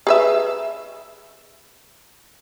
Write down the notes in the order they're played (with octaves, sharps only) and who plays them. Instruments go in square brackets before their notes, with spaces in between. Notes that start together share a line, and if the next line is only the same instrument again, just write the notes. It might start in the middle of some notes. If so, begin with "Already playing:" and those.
[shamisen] G#4 B4 E5